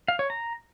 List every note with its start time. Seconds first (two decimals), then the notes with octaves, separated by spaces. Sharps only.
0.08 F5
0.19 C#5
0.30 A#5